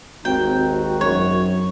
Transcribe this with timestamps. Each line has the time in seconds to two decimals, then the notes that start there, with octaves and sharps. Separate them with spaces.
0.25 G#1 D#2 C4 D#4 F#4 G5
1.01 F#2 C#5